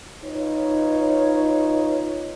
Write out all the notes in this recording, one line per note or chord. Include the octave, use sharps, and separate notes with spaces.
D#4 F4 B4 C#5